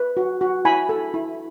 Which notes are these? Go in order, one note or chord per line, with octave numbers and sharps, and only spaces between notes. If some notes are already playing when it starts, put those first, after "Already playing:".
Already playing: B4
F#4
F#4
E4 G#5 B5
A4
E4